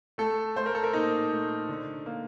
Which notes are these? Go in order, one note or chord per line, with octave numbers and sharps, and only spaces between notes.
A3 A4
A3 C5
A#4
A4
A#4
A#2 D#4
A3
D3
A#3